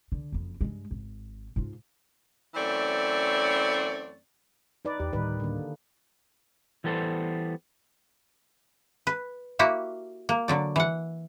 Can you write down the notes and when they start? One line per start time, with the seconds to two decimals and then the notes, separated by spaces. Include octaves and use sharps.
0.12 D3
0.32 F#1 F2
0.61 G2 G#3
0.91 G#1
1.56 G#2 F4
2.55 F#2 E3 A3 C4 C#5 D5
4.85 D#4 B4 D5
5.00 E2 G4
5.13 D2 A2 D#3 G3 D#4 B4
5.40 D3 A#3
6.84 E3 G3 B3 A4 C5
9.07 B4
9.59 A#3 E4 F#4 G4
10.29 A#3
10.48 D3 F#3 D5
10.76 E3 F#5